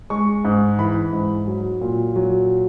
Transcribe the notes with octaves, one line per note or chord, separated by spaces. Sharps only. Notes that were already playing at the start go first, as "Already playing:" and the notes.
G#3 C#6
G#2
E3 B5
G#2
F#3
A#2
F#3